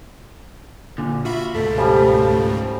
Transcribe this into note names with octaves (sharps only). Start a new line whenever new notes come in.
A#2 D3
F4 F#4 E5 B5
C#2 G#2 B2 A3
C#3 F3 G3